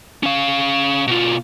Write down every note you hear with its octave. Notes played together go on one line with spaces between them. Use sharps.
C#4 F5
B2 F4